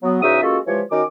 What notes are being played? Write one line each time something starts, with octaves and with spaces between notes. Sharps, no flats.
F#3 B3
E2 C#3 D#4 F#4 E5 D#6
G#3 A#3 C#4 F4 F#4 A4
E3 F3 G#3 F4 G4 C#5
D#3 C#4 F#4 D6